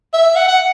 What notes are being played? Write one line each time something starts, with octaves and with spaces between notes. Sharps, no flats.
E5
F#5
F#5